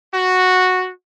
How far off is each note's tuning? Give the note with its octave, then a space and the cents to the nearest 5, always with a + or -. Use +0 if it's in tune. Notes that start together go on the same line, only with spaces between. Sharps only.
F#4 -5